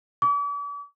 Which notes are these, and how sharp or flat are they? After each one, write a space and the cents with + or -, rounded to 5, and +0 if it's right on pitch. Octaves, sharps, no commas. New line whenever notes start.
D6 -45